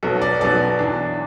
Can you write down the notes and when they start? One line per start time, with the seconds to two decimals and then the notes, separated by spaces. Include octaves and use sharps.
0.03 B1 B2 F#3 B3 A4
0.22 D5
0.41 B1 B2 F#3 B3 D5
0.79 E2 E3 D4